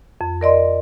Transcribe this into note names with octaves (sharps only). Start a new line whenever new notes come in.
F2
A#4 D5 D#5 C6